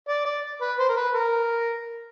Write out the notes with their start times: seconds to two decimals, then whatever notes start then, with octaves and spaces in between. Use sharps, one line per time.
0.09 D5
0.25 D5
0.61 B4
0.79 C5
0.89 A#4
0.97 B4
1.15 A#4